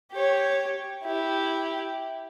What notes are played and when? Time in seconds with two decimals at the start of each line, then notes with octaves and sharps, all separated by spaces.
0.12 G4 C#5
1.04 E4 G4